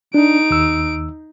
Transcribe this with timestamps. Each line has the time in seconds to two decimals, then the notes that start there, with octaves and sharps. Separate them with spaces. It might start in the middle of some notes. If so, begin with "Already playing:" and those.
0.14 D4 D#4 D7
0.50 D#2 E6